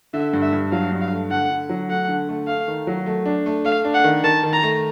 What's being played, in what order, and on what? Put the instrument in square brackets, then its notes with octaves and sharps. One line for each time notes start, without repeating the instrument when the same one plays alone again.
[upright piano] D3 [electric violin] E5
[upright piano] G2
[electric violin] E5
[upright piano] G2
[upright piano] F#3 [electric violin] F5
[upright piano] G2
[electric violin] F5
[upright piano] A3
[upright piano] D3 [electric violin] F#5
[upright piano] D3
F#3
[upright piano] A3 [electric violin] F#5
[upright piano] D3
A3
[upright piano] A3 [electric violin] F5
[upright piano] D#3
F#3
A3
D4
A3
[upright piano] A3 [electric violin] F5
[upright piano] D4
[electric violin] F#5
[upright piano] D#3
[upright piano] D#3 [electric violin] A5
[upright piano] D#3
[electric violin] A#5
[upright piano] A3